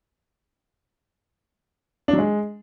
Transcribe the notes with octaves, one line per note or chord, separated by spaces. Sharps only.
D4
F#3
G#3